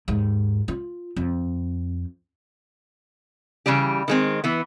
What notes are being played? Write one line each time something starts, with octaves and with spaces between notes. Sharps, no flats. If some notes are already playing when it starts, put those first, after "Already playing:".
D#2 G#2
F4
F2
C#3 E3 G3 G4
D#3 G#3 C4
E3 B3